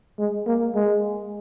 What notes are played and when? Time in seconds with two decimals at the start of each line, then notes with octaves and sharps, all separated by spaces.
0.19 G#3
0.47 A#3
0.75 G#3